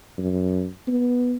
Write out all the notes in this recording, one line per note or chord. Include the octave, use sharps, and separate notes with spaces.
F#2
B3